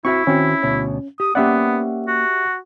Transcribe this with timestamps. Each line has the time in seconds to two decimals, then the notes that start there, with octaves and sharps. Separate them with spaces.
0.05 C4 E4 F#4 E5 C#6
0.27 D#3 C4 C#4 F#4
0.63 D2 B2 C#5
1.20 G4 D#6
1.35 A#3 B3 C#4 G4 D5 E5 F#5
2.07 F#4